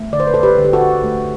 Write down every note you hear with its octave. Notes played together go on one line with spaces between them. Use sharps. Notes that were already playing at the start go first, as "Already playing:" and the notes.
Already playing: A3
D3 D5
C5
B4
A4 C5
G4 B4
D3
G4
F#4 A4
A3